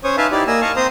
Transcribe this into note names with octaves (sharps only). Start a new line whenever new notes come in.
C#4 C5 C#5 C#6 D#6
D#4 B4 E5 F5 G#5 A5
D#4 E4 G4 D5
A#3 D#5 G#5 E6
D#5 F5 A5 C#6
C4 C5 A#5 C6 D#6